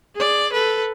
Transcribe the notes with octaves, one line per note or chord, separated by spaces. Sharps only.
G#4 D5
A4 B4